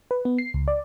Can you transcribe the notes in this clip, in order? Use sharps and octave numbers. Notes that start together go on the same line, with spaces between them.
B4
B3
C7
C#2
D5